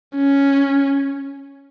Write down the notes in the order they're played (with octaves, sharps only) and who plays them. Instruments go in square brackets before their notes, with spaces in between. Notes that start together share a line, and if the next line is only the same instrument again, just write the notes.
[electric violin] C#4